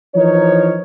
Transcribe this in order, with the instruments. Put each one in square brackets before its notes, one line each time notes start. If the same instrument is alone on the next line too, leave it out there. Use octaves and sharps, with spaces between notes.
[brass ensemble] E3 F3 D#4 A#4 C#5